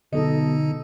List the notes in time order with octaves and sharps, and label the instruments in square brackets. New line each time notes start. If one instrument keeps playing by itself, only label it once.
[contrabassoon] B1 [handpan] B2 A4 D#5 [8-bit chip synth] D3 D#4